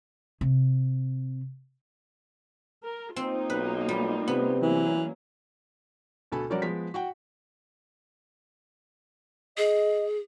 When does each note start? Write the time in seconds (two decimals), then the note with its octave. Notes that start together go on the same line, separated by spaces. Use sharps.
0.41 C3
2.83 A#4
3.16 A#3 C4 D#4 F4
3.50 B1 B4
3.89 G3
4.28 C3 B3
4.63 E3 F#3 A#3 C#4
6.32 D2 B2 A4 G#5 B5
6.50 F3 G3 C#4 F#4 A#4 D5
6.62 F3 G#3 B3 B6
6.94 F#4 F#5 G5
9.58 G#4 D#5